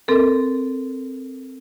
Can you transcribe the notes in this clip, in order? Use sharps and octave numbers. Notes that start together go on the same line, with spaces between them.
C4 A4 A#4